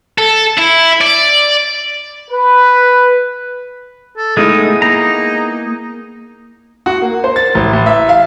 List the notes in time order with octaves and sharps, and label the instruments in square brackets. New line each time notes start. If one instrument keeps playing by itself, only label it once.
[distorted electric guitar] A4
E4
D5
[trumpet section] B4
[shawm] A4
[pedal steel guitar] G#3 A3 D#4 [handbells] B3 E4 G#4 [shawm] D#6
[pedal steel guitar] A#3 A#5 [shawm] D#4
[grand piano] F#4
A#3
C5
A6
A1
A1
E5
F5